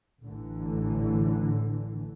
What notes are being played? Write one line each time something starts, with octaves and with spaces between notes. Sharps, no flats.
A1 D3 E3